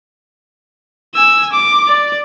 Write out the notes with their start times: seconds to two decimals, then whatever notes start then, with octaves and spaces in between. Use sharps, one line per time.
1.15 G#5 E6
1.52 D6
1.87 D5